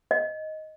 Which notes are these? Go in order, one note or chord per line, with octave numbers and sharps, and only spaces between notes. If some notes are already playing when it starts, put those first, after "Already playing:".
D#5